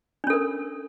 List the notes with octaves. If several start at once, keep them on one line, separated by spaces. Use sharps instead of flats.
C#4 D4 A4 A#4